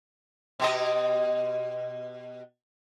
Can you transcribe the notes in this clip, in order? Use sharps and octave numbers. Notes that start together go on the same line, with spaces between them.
B2 G4 D#5